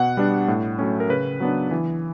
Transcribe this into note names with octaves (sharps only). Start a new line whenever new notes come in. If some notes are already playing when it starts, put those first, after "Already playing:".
Already playing: B2 F#5
G3 B3 D4
A2
F#3 A3 C#4
A#4
C#3 B4
F#3 B3 D4
E3